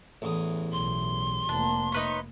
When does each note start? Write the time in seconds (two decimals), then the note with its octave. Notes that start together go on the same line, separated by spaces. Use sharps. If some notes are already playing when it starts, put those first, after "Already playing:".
0.22 A1 E2 D#6
0.72 B1 C6
1.49 F1 A#3 D4
1.92 D#4 B4 C#5